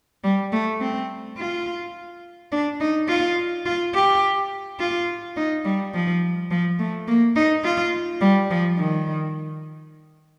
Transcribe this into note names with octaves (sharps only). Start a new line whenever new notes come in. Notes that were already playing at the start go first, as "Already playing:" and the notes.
G3
A3
C4
F4
D4
D#4
F4
F4
G4
F4
D#4
G3
F3
F3
A3
A#3
D#4
F4
G3
F3
D#3